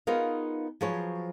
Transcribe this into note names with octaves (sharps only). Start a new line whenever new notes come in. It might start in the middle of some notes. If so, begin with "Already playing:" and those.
B3 D#4 F4 G#4 A#4 F5
F3 F#3 G#4 B4 C#5